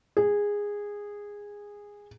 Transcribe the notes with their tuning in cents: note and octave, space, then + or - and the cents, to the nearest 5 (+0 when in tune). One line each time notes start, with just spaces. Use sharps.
G#4 -15